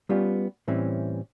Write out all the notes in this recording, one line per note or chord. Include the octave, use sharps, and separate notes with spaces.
G3 B3 C#4 F4 G4
A2 E3 G3 C4 C#4